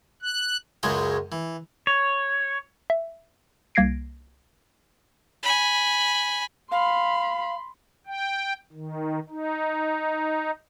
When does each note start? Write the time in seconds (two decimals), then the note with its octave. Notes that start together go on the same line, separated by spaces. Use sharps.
0.22 F#6
0.83 C#2 F#2 F#3 G#3 C#5 D#5
1.32 E3
1.87 C#5
2.90 E5
3.75 C2 A#3 G#6 A#6 C7 D7
5.43 G#5 B5
6.71 F5 B5 C6
8.07 G5
8.73 D#3
9.30 D#4